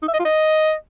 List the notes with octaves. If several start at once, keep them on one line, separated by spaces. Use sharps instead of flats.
D#4
E5
D#5
F4
D#5